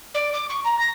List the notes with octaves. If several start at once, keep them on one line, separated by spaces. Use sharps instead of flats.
D5
D6
C#6
A#5
A#6